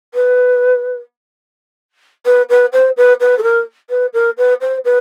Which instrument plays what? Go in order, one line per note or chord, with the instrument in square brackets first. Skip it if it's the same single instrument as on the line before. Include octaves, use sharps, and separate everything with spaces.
[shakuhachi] B4
B4
B4
C5
B4
B4
A4
A#4
B4
A#4
B4
C5
B4